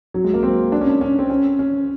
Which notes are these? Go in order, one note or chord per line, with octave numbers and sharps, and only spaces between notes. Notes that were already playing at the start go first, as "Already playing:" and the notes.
F#3
G#3
A#3
C4
D4
C#4
D4
C#4
C4
C#4
C#4